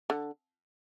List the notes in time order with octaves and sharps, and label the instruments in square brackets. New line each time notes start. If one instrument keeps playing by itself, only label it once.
[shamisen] D3